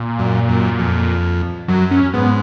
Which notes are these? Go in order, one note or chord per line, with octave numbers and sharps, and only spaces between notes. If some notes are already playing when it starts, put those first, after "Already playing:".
Already playing: A#2
F#2
F#2
F2
F#2 F#3
C#4
G#2 B3